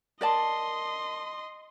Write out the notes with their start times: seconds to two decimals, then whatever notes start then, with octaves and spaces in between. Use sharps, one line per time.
0.21 A#4 D5 D#5 A5 C6